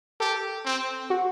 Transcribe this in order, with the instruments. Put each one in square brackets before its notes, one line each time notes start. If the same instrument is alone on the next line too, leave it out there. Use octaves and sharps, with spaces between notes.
[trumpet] G4 [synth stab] A4
[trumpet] C4
[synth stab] F#4